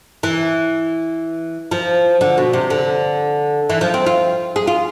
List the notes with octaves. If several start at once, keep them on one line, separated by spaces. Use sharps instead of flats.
E3
F3
D3
B2
C3
D3
E3
F3
C4
F4
G#4
F4